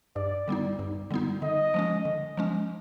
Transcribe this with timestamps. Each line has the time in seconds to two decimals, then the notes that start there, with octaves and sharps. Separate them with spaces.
0.16 G2 D5
0.48 D3 G3 B3 D#4
0.79 G2
1.11 D3 G3 B3 D#4
1.42 D3 D#5
1.74 F3 G#3 C#4
2.05 D3
2.37 F3 G#3 C#4